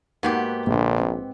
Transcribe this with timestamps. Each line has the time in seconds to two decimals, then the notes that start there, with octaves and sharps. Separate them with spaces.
0.23 G#2 A#3 B3 F#4 G4
0.67 A#1 A#2 D3
1.00 C4